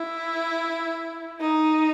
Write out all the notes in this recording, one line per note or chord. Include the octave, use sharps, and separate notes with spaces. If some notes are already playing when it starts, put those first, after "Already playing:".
Already playing: E4
D#4